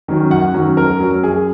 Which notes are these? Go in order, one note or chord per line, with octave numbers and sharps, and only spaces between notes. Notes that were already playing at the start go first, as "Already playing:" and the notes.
D#3 F#3 C#4
F#2 F#5
D#3 F#3 C#4
F#2 A#4
F#3 C#4
F#2 G#4